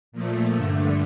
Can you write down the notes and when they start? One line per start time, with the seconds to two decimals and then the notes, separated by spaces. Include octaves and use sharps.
0.12 A#2 F3 A3
0.56 G2 D3 A3